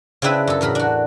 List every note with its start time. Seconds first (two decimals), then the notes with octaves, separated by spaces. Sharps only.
0.22 C#3 C4 D4 E4 B4 E5
0.47 F#2 A4
0.61 E2 A2 A#4 B5
0.75 D4 F#4